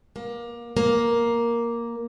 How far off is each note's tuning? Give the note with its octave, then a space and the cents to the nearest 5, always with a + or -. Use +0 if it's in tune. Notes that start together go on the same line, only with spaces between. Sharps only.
A#3 +25
A#3 +5